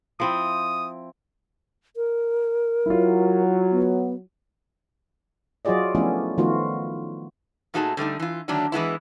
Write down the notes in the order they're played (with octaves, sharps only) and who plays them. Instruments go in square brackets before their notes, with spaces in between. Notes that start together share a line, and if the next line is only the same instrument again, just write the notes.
[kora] F3 C4 E4 [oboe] D#6
[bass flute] A#4
[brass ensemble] F#3 [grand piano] E4 F4
[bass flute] B3
[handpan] F#3 F4 F#4 G#4 D5 D#5
F3 A3 B3 C#4 D4 E4
D#3 F3 A3 B3 F4 F#4
[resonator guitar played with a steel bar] A#2 A3 D#4 F#4 G#4 A5
D3 G3 A3 D#4
E3 F4
D3 D#3 F#3 A3 D4
E3 G#3 B3 E4